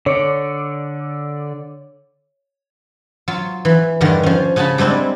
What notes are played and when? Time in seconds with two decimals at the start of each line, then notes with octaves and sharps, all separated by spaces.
0.06 D3 C#5 D5
3.28 F#3 F4
3.65 E3
4.01 E2 G2 D3 D#3
4.23 F3 C#4
4.56 C#3 C#4 F#4 A5 B5
4.78 G3 G#3 C4 D4 E4